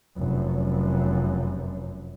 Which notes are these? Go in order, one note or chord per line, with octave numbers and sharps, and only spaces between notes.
F1 F#2